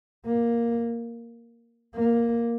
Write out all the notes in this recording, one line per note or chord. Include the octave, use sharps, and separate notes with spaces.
A#3
A#3